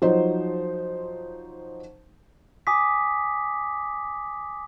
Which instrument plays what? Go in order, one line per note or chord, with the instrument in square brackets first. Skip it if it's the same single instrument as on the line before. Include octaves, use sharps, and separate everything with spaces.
[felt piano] F3 F#3 D#4 C5
[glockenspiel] G#5 D6 D#6 B6